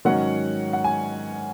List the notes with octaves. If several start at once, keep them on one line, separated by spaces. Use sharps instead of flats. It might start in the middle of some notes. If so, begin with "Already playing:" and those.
G#2 D#3 F#3 C#4 F#5
F#5
G#5